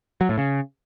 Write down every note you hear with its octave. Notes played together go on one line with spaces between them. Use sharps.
F#3
A2
C#3